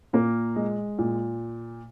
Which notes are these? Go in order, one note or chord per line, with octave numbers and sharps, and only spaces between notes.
A#2 A#3 A#4
G#3
A#2